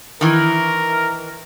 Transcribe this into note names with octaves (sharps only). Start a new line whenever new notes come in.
D#3 E3 A#4